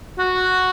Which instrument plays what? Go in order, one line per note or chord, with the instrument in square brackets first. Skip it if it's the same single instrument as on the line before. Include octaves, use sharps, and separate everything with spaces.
[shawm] F#4